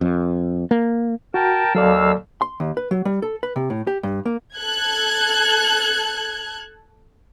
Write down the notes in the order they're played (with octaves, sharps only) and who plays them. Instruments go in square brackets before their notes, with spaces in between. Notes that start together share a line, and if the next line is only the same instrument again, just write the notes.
[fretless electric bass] F2
A#3
[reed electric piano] F#4 [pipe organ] A#4 G5 A5
[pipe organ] D#2 F5 E6 [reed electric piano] F#3 A4 D5
[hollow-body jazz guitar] C6
D#2
B4
F#3
G3
A4
B4
C3
A2
G4
G2
A#3
[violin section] A4 F#6 G#6